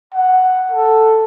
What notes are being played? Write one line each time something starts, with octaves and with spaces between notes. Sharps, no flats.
F#5
A4